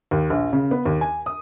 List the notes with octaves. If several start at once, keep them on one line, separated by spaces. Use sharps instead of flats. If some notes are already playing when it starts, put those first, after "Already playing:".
D#2
A#1
C#3
B3
D#2
G#5
D#6